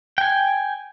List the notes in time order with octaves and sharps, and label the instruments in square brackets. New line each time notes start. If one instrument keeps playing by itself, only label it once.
[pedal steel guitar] G5 G#5